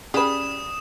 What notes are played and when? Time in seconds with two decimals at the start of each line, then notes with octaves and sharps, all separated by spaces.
0.14 C#4 G4 G#4 B4 D5 D#6 E7